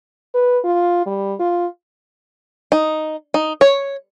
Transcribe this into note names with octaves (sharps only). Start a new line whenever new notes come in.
B4
F4
G3
F4
D#4
D#4
C#5